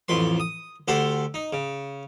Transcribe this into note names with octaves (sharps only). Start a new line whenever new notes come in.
A1 F2 B4 C6
D#6
D2 G4 A4 F#5 C6
D#4
C#3